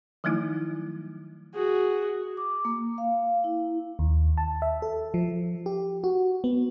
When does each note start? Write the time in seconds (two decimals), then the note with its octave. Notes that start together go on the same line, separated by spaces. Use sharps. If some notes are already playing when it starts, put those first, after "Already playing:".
0.24 D#3 F3 F#3 A3 D#4 E4
1.54 F#4 G#4
2.37 D6
2.65 A#3
2.98 F5
3.44 E4
3.99 D#2
4.38 A5
4.62 E5
4.82 A4
5.14 F3
5.66 G4
6.04 F#4
6.44 B3